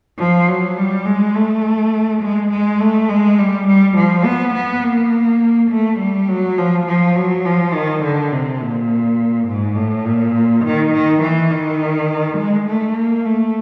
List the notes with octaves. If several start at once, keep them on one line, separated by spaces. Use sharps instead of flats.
F3
F#3
G3
G#3
A3
G#3
G#3
A3
G#3
G3
G3
F3
B3
B3
A#3
A3
G3
F#3
F3
F3
F#3
F3
D#3
D3
C3
A#2
G#2
A2
A#2
D#3
D#3
E3
D#3
G#3
A3
A#3
A3